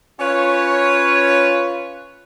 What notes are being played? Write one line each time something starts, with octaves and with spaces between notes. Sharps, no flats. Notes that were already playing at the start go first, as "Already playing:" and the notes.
C#4 F4 B4 C#5